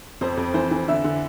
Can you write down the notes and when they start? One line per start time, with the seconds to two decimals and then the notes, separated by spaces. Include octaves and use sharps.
0.21 F2 C5
0.37 F2
0.54 E3 C5
0.71 E3
0.88 D3 E5
1.04 D3